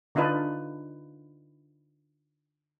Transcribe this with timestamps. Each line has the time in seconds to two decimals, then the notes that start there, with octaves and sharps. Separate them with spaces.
0.15 D3 D4 D#4 F4 B4